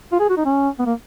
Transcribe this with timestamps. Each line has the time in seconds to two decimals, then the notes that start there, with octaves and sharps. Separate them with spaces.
0.12 F4
0.20 G#4
0.29 F#4
0.37 D#4
0.45 C#4
0.79 B3
0.86 A#3